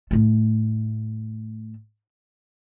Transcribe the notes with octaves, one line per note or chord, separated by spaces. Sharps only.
A2 A3